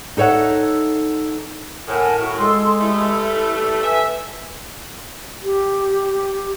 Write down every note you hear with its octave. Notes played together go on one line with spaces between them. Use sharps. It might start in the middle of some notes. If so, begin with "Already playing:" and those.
D#4 A4 C#5 E5 F#5
A2 A#4 F#5 G#5 A5
E4 F#4 C#6
G#3 A4 C6 E6
E3 G3 A3 E4 E6
A4
B4 E5 G#5
G4